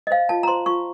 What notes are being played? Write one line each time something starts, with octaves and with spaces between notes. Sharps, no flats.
D#5
C5 F5
F4 A5
A#5
C5 C6
F4 C#6